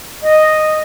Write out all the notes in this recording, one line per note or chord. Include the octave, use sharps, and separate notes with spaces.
D#5